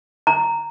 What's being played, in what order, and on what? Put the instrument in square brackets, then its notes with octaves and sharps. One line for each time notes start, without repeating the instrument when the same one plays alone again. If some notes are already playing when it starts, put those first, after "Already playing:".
[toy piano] A#5